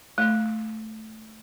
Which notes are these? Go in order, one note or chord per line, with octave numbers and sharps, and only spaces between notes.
A3